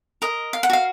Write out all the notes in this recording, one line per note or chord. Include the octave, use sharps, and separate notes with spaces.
A#4 D#5
F5
F#5
F#4 F5